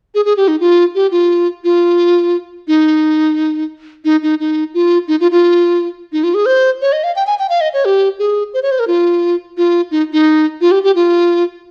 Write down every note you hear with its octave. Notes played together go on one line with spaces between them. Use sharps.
G#4
G#4
G4
D#4
F4
G4
F4
F4
D#4
D#4
D#4
D#4
F4
D#4
F4
F4
D#4
F4
G#4
C5
C#5
D#5
F5
G5
G#5
G5
F5
D#5
C#5
G4
G#4
C5
C#5
C5
A#4
F4
F4
D#4
D#4
F4
G4
G4
F4